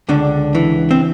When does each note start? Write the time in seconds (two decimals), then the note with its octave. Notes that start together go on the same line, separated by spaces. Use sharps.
0.09 C#2 D3 D4
0.55 E3
0.91 C4